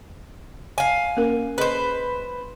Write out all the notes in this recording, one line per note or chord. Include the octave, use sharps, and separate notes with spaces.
F5 G#5
A#3 C#4 A#4
G#4 B4 C5 D#5 C6